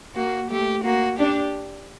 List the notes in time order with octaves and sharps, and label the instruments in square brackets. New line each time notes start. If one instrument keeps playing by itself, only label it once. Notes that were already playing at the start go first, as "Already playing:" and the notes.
[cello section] A#3 [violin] F#4
[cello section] A3 [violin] G4
[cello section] A#3 [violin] F#4
[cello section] D4 [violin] G4